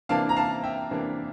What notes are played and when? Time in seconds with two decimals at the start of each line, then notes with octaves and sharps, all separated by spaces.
0.09 C3 E3 A#3 D4 F5 A5
0.29 A#5
0.36 F5 A5
0.64 E5 G5
0.91 C3 E3 A#3 D4